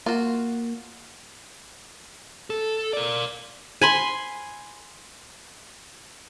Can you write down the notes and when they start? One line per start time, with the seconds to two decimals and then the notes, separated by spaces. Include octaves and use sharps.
0.06 A#3 F4 F#4
2.50 A4
2.93 A#4 D5
3.81 G#5 B5 C6